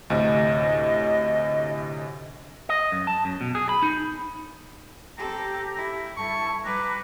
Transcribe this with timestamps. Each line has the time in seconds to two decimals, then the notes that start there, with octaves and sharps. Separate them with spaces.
0.10 D2 A2 C3 D#5
2.69 D#5
2.92 F#2
3.07 A5
3.25 F#2
3.41 B2
3.55 G#4
3.69 B5
3.82 D#4
5.18 C4 G4 A4 A#5
5.76 E4
6.17 G2 E4 A4 A5 C#6
6.64 G3 B4 A#5 D6 F#6